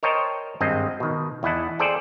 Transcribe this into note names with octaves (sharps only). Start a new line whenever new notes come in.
A#4 C5 C#5 D#5 G5 A5
G#1 G2 G#3 C4 D#5
B2 D#3
E2 E4 D#5 F#5 A5
G#4 A4 C5 D5 G5